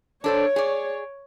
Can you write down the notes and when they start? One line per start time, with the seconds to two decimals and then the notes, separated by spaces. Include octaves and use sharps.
0.24 D4 A4 C5 C#5
0.56 G#4 D5